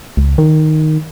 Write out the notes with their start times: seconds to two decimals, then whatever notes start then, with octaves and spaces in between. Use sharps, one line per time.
0.17 C#2
0.38 D#3